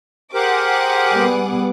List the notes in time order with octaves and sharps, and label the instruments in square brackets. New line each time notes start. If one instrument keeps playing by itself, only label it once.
[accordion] G4 A#4 C5 [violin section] G#4 F#5 D6
[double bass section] G3 B3